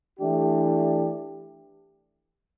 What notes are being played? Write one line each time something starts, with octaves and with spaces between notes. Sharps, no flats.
E3 A3 D4 G4